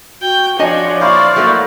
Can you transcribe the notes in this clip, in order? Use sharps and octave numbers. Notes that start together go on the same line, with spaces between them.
F#4 G5
F3 D4 F#4 C#5 D#5 G#5
A#2 E4 C5 D5 F5 C#6
F#3 A3 A#3